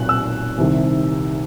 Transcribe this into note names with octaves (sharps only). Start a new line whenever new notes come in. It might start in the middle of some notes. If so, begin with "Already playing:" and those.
Already playing: B1 A#2 F#6
E6
C2 C3 D#3